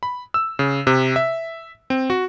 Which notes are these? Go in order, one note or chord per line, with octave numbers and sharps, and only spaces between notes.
B5
E6
C#3
C3
E5
C4
F#4